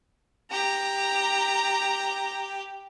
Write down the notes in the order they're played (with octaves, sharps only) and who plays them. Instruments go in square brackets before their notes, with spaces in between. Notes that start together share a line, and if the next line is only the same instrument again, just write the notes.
[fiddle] G4 [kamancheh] A#5